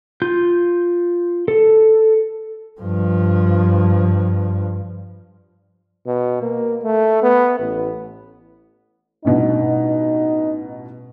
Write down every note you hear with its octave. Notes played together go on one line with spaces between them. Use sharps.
F4 G6
A4
G2 F3
B2
A#3
A3
B3
A1
A1 G2 B2 D#4